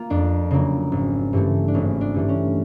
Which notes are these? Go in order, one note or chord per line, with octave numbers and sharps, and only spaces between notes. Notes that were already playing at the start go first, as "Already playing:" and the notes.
Already playing: A#3 F4
F2 D4
C#3 F#3 A#3
G#1
G2 E3 A3
D4
G#1 C#4
D4
G2 E3 A3
C#4